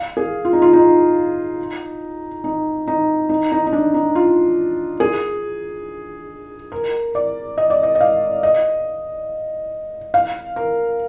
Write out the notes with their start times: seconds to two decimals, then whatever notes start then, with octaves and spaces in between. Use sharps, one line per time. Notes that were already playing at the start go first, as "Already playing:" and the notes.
Already playing: F5
0.17 G#4
0.45 F4
0.53 D#4
0.62 F4
0.73 D#4
2.44 D#4
2.88 D#4
3.29 D#4
3.52 D#4
3.67 D#4
3.73 D4
3.94 D#4
4.15 F4
5.00 G#4
6.72 A#4
7.15 D5
7.58 D#5
7.70 D5
7.83 D#5
7.95 D#5
8.01 F5
8.43 D#5
10.14 F5
10.56 A#4